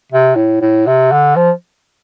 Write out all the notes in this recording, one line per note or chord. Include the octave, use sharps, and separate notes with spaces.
C3
A2
A2
C3
D3
F3